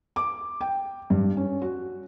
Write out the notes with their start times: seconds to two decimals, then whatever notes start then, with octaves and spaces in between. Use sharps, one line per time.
0.16 D6
0.61 G5
1.10 G2
1.37 C#4
1.62 F#4